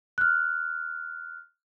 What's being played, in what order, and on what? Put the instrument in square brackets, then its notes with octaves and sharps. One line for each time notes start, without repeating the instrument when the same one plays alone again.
[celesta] F6 F#6